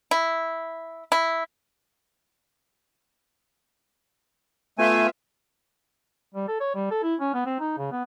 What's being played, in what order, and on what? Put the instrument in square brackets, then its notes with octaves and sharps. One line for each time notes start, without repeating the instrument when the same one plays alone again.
[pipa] E4
E4
[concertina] A3 G#5 [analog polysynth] B3 F4 E5
[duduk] G3
A4
C#5
G3
A4
E4
C#4
B3
C4
D#4
C#3
B3